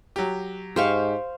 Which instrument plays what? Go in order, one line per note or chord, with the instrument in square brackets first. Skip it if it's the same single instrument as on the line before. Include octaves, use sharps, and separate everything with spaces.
[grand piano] F#3 G4
[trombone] G#2 [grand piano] G4 [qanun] C5 F5 C#6